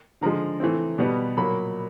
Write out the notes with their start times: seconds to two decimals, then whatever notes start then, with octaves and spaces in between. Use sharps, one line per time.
0.21 D3 F3 G#3 A#5
0.60 E3 A3 C4
0.98 B2 G3 B3
1.37 A#2 F#3 A#3 B5